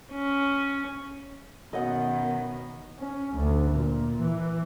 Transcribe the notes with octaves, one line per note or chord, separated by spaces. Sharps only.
C#4
F#2 B2 D#3 B3 D#5 F#5
C#4
D2
A#2
E3